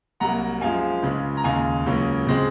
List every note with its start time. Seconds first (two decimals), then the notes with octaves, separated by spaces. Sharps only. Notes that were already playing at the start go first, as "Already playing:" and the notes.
0.20 C2 C3 F#3 A#3 F#5 A#5
0.61 F#2 F3 G#3 F5 G#5
1.03 C#2 C#3 G#3
1.37 A#5
1.44 D#2 C#3 G#3 F5 G#5
1.86 C#2 C#3 F#3 A#3 C#4
2.27 C#3 G#3 C4